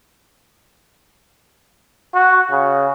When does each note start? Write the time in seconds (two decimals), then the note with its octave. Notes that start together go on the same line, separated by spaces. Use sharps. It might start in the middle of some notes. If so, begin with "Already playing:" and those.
2.14 F#4
2.51 C#3